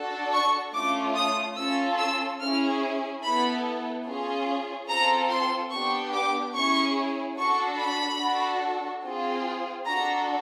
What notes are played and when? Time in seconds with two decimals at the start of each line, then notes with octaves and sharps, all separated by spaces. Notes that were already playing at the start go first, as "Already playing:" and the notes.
Already playing: D4 F#4 A4
0.32 C#6
0.73 A3 C#4 F4 D6
1.15 D#6
1.56 C#4 F4 A4 E6
1.97 E6
2.40 C#4 E4 G#4 F6
3.23 B3 E4 A4 B5
4.05 C#4 F4 G#4
4.88 C4 F4 A4 A#5
5.29 C6
5.71 B3 D4 G4 C#6
6.12 D6
6.54 C#4 E4 G#4 C#6
7.38 D4 F#4 A4 C#6
7.79 B5
8.20 D4 F#4 A4
9.03 C4 F4 G#4
9.86 D4 F#4 A4 A#5